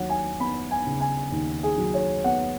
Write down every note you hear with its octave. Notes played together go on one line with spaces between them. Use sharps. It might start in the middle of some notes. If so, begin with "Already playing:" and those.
Already playing: D#2 F#3 C#5 F#5
G#5
B3 B5
G#5
C#3
G#5
D#2
G#4
F#3
C#5
B3 F#5